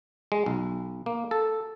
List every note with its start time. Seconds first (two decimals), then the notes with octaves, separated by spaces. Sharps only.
0.32 G#3
0.46 B1
1.06 A#3
1.31 A4